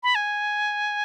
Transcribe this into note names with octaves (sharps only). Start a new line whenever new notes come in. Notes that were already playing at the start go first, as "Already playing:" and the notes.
B5
G#5